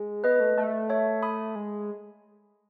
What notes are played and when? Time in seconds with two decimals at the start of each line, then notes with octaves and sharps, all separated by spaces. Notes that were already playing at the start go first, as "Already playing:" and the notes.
Already playing: G#3
0.24 B3 B4 D#5
0.40 A3
0.57 A3
0.90 C#5 E5
1.23 B5 D#6
1.56 G#3